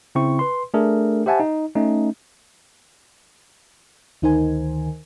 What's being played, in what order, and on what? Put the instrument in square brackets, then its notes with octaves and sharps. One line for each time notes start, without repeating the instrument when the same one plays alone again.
[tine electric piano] C#3 C4 E4 C#6
B4 C6
A3 D4 G#4 A#4
G4 C5 E5 F#5 G#5 A5
D#4
A3 C#4 D#4
[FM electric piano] D2 D#3 D#4 A#4 C5 G#5